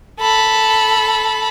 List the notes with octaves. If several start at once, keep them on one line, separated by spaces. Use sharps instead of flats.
A4 B5